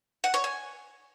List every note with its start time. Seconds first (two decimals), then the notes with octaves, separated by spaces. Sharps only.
0.24 F#5
0.34 C#5
0.44 G#5